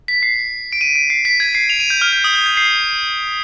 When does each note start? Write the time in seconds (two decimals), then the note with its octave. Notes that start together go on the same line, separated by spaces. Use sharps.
0.08 B6
0.23 C7
0.72 D7
0.81 D#7
0.96 D7
1.10 C7
1.25 B6
1.40 G#6
1.55 C7
1.70 F7
1.80 D#7
1.90 G6
2.01 F6
2.13 G6
2.24 D#6
2.35 G6
2.46 G6
2.57 C7